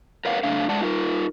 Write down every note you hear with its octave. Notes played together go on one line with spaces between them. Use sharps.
A#4 B4 C#5 F5 F#5
C#3 A3 D4 F5
G#3 D5 F#5 A5
D#4 F4 A#4